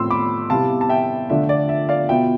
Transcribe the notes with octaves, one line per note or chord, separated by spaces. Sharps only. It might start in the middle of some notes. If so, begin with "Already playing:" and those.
Already playing: A2 F3 C4 C6 E6
B5 D6
C3 G3 B3 E4 F5 A5
A5
E5 G5
D3 F3 A3 D4 F4 E5
D5
E5
D5 F5
B2 B3 F4 E5 G5